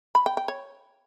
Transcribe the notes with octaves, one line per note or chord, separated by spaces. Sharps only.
B5
G5
G5
C#5